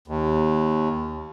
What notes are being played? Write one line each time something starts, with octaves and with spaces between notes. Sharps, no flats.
D#2